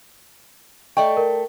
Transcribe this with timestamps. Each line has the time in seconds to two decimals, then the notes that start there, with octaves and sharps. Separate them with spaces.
0.97 A3 D5 D#5 G5 C#6
1.17 A#4